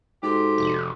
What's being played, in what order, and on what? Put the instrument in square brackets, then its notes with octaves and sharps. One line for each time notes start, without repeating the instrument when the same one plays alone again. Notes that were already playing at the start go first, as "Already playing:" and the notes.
[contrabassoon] G#2 [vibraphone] F#4 A4 C6 [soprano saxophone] G4
[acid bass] F1